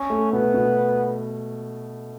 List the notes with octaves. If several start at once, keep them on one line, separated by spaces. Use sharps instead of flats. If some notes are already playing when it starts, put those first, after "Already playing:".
Already playing: C#4
A3
B2 B3
B2